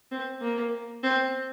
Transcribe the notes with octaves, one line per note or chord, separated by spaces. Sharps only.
C4
A#3
C4